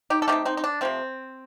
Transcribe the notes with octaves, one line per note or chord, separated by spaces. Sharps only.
D#4 G4
A4
C3 F3 A3 D#4 G4
C4 D#4
D#4
D4
C3 F3 A3 C4